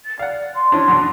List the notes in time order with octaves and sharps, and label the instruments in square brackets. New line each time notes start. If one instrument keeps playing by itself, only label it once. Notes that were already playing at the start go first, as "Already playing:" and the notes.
[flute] A6
[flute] D5 [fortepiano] F5 F#5
[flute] C6
[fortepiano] E3 C#4 D4
F#2 B2 D4